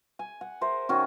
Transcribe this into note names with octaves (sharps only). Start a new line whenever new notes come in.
G#5
F#5
A#4 C5 E5
D#3 C#4 F#4